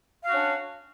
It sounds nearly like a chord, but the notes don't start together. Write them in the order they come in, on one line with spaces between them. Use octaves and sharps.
F5 F#4 D4 C#4